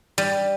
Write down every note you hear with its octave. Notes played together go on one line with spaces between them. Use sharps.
G3